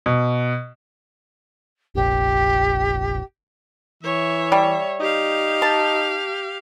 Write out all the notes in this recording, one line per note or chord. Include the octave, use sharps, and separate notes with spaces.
B2
F1 A#1 G4
E3 C#5 E5
G3
D#4 G4 F5
A5